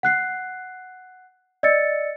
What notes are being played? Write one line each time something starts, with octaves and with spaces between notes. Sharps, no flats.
F#5 F#6 C7
D5 D#5 E6 A6 C#7